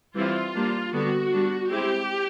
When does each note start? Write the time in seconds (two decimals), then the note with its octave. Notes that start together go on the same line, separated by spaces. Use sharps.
0.15 E3 G3 C4 E4 F4
0.55 G3 A#3 D4
0.93 D3 G3 B3 F#4
1.32 G3 B3 D4
1.71 G#3 C4 E4 G4